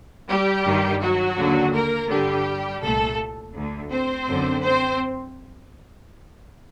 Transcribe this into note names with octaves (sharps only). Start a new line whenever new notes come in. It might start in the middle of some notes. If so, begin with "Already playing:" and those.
G3 G4
G2 D#3
F#3 F#4
D#2 D3
A#3 A#4
G2 D3 G3 G4
C2 A#2 A3 A4
D2 D3
C4 C5
F#2 D3
C4 C5